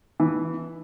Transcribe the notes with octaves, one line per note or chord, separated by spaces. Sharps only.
E3